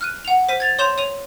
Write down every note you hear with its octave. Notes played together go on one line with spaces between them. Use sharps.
F6 F#6 D#7
F#5 F7
C5 B6 D#7
G#6 A6 F7
C#5 C6 G6 E7 F7
C#5 D#7 F7